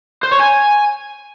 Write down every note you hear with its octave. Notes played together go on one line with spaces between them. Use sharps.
C5
C#5
G#5